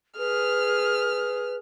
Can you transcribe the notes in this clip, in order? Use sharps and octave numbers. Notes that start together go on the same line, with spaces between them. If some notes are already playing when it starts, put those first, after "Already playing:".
G#4 B4 F6